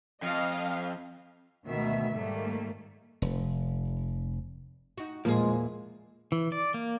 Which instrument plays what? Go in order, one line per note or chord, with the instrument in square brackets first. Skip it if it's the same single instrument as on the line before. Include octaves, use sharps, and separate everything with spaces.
[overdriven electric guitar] F2 [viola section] D#5 F5
[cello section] D2 G#2 B2 D#3 B3 E5
G#2 D#3 G3 A3 A#3
[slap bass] F1
[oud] D#4 F#4
[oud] E2 A#2 G#4 [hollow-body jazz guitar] F3 [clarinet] G#3 [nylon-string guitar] A#3
[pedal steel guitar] E3
D5
A#3